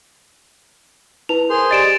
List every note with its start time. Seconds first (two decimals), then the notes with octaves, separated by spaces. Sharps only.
1.29 E4 B4 A5 F7
1.50 G#4 A#4 C5 C6
1.71 G4 D5 D#5 A6 D7 E7